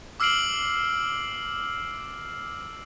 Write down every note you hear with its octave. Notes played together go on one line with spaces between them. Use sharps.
D6 E6 F6 C7 D7 F#7